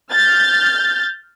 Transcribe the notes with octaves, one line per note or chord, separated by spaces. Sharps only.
F6 G6 A6